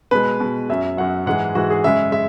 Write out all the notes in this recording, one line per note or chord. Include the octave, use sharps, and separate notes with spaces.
B2 G#3 B4
B2 G#3
F#2 F#3 E5
F#2 F#3 F#5
G#2 E3 G#3 F#5
G#2 E3 G#3 F#4
G#4
F#2 C#3 G#3 E5
G#3 E5